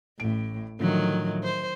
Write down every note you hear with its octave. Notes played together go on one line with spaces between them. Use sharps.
A1 A2 D7
A2 D3 D#3 F3 F#3
C5